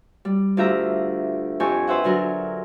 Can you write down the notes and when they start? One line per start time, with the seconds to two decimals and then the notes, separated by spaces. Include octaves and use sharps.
0.25 G3
0.57 D2 F4 G4 E5 A#5
1.60 F2 G4 G#5 C#6
1.87 B4 C5 E5 F#5
2.04 D3 F#3 A#4